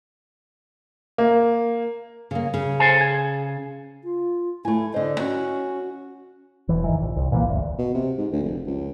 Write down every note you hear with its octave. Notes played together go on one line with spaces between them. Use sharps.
A#3
C#3 A#3
C#3
A4 C5 G#5
G#4
F4
A3 E4 G#5
D3 C5 D#5
C#4 F#4
E1 E3
G#1 D#3 E3
A#1
C2
A#2 E3 A#3
G1 D2
B2
C3
G#2
D2
F1
C#2